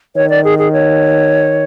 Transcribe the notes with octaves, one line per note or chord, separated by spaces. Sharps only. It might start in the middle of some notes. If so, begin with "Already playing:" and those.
D#3 C#5
D5
G#4
G#4
C#5